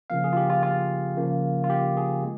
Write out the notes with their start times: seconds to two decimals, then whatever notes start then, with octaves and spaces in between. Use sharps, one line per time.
0.10 C#3 F3 A#3 F5
0.24 G#4
0.33 F4
0.37 G4
0.50 F4
0.63 F4
1.17 C#3 F3 A#3
1.64 F4
1.70 G4
1.97 G#4
2.23 G#3